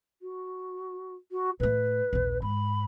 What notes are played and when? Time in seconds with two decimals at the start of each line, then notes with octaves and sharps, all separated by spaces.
0.22 F#4
1.31 F#4
1.60 A2 A3 B4
2.13 A#1 D#2
2.42 G#2 B5